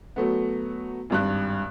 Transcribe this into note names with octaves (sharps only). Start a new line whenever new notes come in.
F#3 A3 B3
G#1 G2 F#6